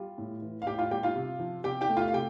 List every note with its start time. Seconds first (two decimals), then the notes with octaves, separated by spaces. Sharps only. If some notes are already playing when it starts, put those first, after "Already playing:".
Already playing: G3 F4
0.18 A2
0.42 E3
0.62 F5
0.67 A2 G4 G5
0.78 F4 F5
0.91 G3 G4 G5
1.03 F4 F5
1.16 C3
1.40 F3
1.64 C3 G4 G5
1.81 G4 G5
1.89 A3
1.97 F4 F5
2.08 F5
2.13 C3 G4 G5